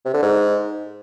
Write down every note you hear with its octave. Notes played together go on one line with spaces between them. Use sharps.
C3
D3
G#2